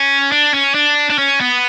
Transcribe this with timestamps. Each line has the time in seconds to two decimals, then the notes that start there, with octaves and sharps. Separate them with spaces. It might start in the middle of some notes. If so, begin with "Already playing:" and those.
Already playing: C#4
0.32 D4
0.54 C#4
0.74 D4
1.10 D4
1.19 C#4
1.40 B3